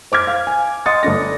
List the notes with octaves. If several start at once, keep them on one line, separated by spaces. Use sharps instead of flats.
C5 D6 F6 G#6
F5 F6
G#5
D#5 F#5 C6 D#6 A6 C#7
G1 A3 D4 A#6
D5